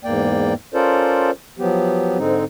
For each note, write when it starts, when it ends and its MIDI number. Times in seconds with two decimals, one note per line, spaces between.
0.04 0.54 40
0.04 0.54 44
0.04 0.54 58
0.04 0.54 74
0.04 0.54 79
0.74 1.31 61
0.74 1.31 65
0.74 1.31 69
0.74 1.31 70
0.74 1.31 72
0.74 1.31 74
1.59 2.18 53
1.59 2.18 54
1.59 2.18 59
1.59 2.18 67
2.18 2.44 44
2.18 2.44 50
2.18 2.44 56
2.18 2.44 60
2.18 2.44 63